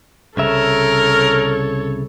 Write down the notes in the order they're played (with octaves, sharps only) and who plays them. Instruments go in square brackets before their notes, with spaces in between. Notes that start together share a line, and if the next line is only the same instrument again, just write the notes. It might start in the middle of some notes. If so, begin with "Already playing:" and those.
[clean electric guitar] C2 C#3 E5 [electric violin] A4 C#5 [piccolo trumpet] A#4